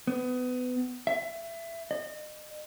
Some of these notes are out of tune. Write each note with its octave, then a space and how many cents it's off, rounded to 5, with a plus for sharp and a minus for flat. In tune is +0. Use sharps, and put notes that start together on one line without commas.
B3 +25
E5 +25
D#5 -35